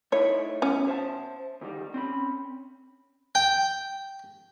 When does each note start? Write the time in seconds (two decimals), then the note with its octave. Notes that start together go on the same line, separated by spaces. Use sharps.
0.12 A3 D#4 E4 C#5
0.62 B2 C#4
0.88 C5 E5 A5
1.61 D2 D#3 G3
1.94 C4 C#4 B5
3.35 G5